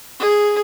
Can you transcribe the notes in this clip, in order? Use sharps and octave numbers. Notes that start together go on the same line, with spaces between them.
G#4